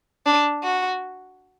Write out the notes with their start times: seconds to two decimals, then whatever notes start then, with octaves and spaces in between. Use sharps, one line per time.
0.26 D4
0.63 F#4